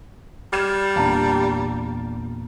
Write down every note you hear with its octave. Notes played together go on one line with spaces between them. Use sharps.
G3 F6 G#6 E7
E2 A#2 D4 F5 A5 A#5